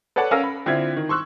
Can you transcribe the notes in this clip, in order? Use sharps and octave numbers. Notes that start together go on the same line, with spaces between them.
A4 B4 C#5 D5 F#5 A5
C#4 A#4 F5 E6 A#6
B5
D3 C4 E4 F4 E5 G#6
D#3
C6 C#6 E6 F#6